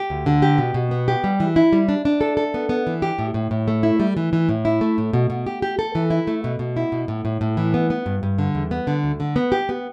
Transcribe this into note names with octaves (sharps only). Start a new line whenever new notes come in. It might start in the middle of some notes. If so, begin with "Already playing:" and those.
Already playing: G4
D2
D3
G4
B2
B2
B3
G4
G3
E3
E4
G3
D4
D4
A4
A4
B3
B3
E3
G4
A2
A2
A2
A3
E4
G3
E3
E3
A2
E4
A3
A2
B2
B2
G4
G4
A4
E3
E4
A3
B2
B2
E4
B2
A2
A2
A2
E3
B3
B3
G2
G2
D3
E2
B3
D3
D2
D3
B3
G4
B3